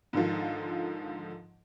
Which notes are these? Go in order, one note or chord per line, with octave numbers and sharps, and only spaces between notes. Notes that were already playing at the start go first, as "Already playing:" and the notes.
G#2 D3 D#3 F3